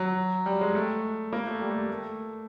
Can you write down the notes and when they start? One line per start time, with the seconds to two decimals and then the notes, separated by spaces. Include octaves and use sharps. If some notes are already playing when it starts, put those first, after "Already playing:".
Already playing: F#3
0.46 G3
0.61 G#3
0.75 A3
1.33 A#3
1.47 A3
1.61 G3
1.71 A3
1.90 A3